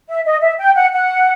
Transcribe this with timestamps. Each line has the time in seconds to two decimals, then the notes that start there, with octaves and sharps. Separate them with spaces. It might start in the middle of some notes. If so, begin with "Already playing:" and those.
0.09 E5
0.25 D#5
0.42 E5
0.59 G5
0.75 F#5
0.92 F#5